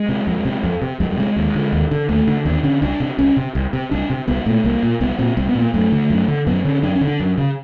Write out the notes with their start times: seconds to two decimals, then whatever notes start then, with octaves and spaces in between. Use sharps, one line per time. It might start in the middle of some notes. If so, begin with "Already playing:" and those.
Already playing: G#3
0.09 C3
0.27 F2
0.45 C3
0.63 F2
0.82 C3
1.00 F2 G#3
1.10 G3
1.18 C3 G#3
1.36 D#2
1.55 D3
1.73 D#2
1.91 D3
2.09 D#2 A3
2.27 D3
2.45 D#2 D4
2.63 D3 C#4
2.82 C2 D4
3.00 C3
3.18 C2 C#4
3.37 C3
3.55 C2
3.73 C3
3.91 C2 D4
4.10 C3
4.28 C2 B3
4.46 A#2 A3
4.64 C2 A#3
4.83 A#2
5.01 C2 B3
5.19 A#2 C4
5.37 C2 C4
5.49 B3
5.55 A#2
5.62 A#3
5.74 F#2 A3
5.92 D3
6.10 F#2
6.28 D3
6.47 F#2 B3
6.65 D3 C#4
6.83 F#2 D4
6.95 C#4
7.01 D3
7.07 D4
7.20 F#2
7.38 C#3